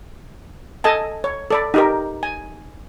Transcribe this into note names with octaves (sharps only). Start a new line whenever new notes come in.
A4 D#5 G#5 A5
C#5
A4 D5 B5
D#4 G4 A#4
G#5